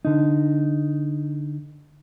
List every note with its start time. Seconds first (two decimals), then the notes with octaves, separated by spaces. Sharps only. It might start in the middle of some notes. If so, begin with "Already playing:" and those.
0.05 D3 D#4